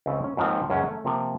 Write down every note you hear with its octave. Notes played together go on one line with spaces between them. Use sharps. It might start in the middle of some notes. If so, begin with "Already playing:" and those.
C#2 C#3 C4 F4
C#4
D#2 G#2 D#3 F3 C4
C#2 F#2 C#4 G#4 F#5
A3
C3 F3 A#3